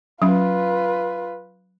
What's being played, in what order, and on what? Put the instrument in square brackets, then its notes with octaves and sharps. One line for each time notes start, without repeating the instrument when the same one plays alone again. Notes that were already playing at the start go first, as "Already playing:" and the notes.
[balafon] F#3 C#4 [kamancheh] F4 B4